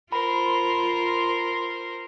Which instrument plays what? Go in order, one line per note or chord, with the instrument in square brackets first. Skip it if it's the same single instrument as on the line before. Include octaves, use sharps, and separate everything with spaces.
[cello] F4 [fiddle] A#4 C5 [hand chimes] B5